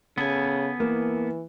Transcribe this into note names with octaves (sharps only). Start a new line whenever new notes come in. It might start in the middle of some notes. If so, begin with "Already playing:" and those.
C#3 B3 A4 G#5
E3 A#3